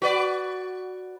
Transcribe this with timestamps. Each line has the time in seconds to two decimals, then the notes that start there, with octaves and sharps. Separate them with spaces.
0.02 F#4 B4 D5